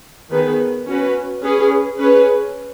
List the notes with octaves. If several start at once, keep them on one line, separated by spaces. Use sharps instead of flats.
D#3 B3 G#4 B4
C#4 F#4 B4
C#4 G#4 B4
C#4 G#4 B4